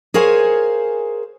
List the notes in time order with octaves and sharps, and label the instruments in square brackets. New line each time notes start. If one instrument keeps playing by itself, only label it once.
[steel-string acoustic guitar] G#4 A#4 C5 C#5 F5 G#5